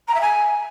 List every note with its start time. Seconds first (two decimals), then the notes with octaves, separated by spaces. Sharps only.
0.08 A#5
0.14 E5
0.20 G#5